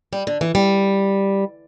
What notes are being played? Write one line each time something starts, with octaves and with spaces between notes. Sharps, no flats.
G3
D3
E3
G3